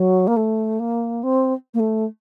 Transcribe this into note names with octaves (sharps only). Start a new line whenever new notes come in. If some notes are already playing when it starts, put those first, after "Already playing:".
Already playing: F#3
A#3
A3
A#3
C4
A#3
A3